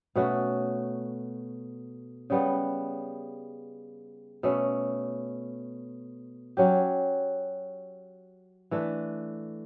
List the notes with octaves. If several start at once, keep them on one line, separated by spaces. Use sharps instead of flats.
B2 A3 C#4 F#4
C#3 G3 B3
B2 A3 C#4
F#3 C#4 G4
E3 A3 D4